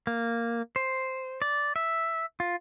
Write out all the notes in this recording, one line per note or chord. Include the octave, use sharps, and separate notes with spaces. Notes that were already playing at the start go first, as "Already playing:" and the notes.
A#3
C5
D5
E5
F4